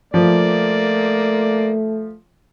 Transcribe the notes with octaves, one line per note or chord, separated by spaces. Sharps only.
F3 A3 A#3 D5